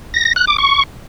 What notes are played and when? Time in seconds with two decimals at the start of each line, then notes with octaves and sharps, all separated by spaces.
0.14 A#6
0.25 A#6
0.36 F#6
0.47 D6
0.58 C#6